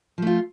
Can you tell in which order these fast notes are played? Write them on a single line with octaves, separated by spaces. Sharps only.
F3 A3 F4